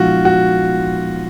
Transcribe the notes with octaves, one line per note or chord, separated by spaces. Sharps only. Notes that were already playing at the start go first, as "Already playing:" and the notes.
Already playing: A#2 F3 G#3 B3 D#4 F4 F#4
F#4